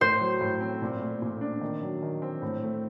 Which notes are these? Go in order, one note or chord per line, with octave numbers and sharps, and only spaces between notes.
A2 C5
F#3
A2
C4
A#2
A3
A#2
D4
D#3
F#3
D#3
C4
A2
A3